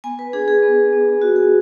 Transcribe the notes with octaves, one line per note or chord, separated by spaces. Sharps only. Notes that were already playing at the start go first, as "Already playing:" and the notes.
B3 G#5
B4
D4 G#4
G#4
B3
B3
F4 F#4
G#4